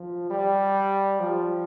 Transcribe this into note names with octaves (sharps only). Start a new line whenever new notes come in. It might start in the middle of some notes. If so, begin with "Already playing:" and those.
Already playing: F3
G3
F3